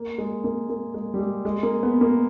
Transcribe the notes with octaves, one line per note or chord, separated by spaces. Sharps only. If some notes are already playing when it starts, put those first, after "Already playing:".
Already playing: A#3
G#3
A#3
A#3
G#3
G3
G#3
G#3
A#3
B3
A#3